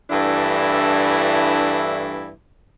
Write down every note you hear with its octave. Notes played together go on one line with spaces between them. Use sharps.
G2 E3 A3 D4 E4